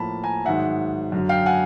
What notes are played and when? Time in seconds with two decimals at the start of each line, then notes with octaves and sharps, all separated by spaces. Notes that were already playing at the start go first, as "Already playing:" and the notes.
Already playing: A2 F3 A#3 A5 B5
0.23 G#5 A#5
0.45 G#2 D#3 F#3 E5 F#5
1.12 F#2 D3 F#3
1.29 F5 G5
1.46 F#5 G#5